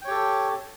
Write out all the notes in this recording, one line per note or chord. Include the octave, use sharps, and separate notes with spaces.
G4 A4 C#5 G5